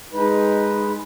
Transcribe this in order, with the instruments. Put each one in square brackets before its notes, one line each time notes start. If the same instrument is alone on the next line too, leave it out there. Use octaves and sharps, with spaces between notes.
[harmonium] G#3 B4 [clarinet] D#4